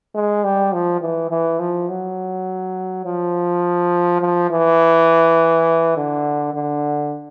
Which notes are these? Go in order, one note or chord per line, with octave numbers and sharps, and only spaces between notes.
G#3
G3
F3
E3
E3
F3
F#3
F3
F3
E3
D3
D3